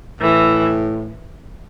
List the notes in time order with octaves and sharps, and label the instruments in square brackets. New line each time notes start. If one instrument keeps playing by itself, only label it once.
[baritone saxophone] A2 [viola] E3